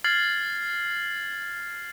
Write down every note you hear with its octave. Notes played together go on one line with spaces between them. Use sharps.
F6 G#6 A6 C7 F#7